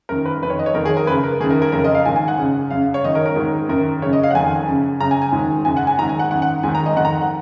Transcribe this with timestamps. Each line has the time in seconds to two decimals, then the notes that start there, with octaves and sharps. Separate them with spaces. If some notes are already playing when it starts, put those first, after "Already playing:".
0.09 F#2 D#3 A#4
0.25 B4
0.42 F2 D#3 B4
0.50 C#5
0.59 D#5
0.66 C#5
0.74 F2 D#3 A#4
0.85 G#4
0.97 A#4
1.07 F#2 C#3 B4
1.24 A#4
1.40 D#3 G#4
1.44 F#2
1.51 A#4
1.62 A#4
1.72 F2 C#3 A#4
1.84 D#5
1.95 F5
2.05 G#2 D#3 G#5
2.16 G#5
2.28 F#5
2.38 F#2 C#3
2.71 F#2 C#3 F5
2.94 C#5
3.04 F#2 D#3 D#5
3.15 A#4
3.26 A#4
3.36 G#2 D#3
3.69 F#2 D#3 A#4
4.02 C#3 C#5
4.06 F#2
4.13 D#5
4.23 F5
4.31 F#5
4.34 F2 D#3 G#5
4.68 F#2 C#3
5.00 F#2 C#3 A#5
5.11 G#5
5.22 G#5
5.33 G#2 D#3
5.65 F#2 C#3 G#5
5.77 F#5
5.87 G#5
5.98 G#2 D#3 A#5
6.09 G#5
6.19 F#5
6.31 F#2 D#3 F#5
6.42 F#5
6.63 G#2 D#3 G#5
6.75 A#5
6.86 D#5
6.96 F2 D#3 F#5
7.05 A#5
7.21 F#5